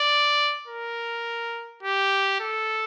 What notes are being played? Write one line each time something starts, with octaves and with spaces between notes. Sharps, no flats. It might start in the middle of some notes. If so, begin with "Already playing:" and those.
Already playing: D5
A#4
G4
A4